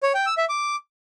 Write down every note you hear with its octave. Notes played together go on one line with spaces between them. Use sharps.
C#5
G5
E6
E5
D6